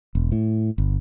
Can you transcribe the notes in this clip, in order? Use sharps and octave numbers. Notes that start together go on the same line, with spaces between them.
E1
A2
G1